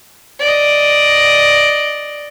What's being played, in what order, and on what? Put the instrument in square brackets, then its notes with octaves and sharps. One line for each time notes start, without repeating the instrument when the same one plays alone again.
[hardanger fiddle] D5 D#5